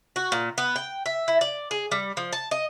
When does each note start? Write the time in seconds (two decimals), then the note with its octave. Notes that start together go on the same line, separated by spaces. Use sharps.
0.16 F#4
0.32 A#2
0.58 B3
0.76 G5
1.06 E5
1.28 E4
1.41 D5
1.71 G#4
1.91 G3
2.17 F3
2.33 A5
2.51 D#5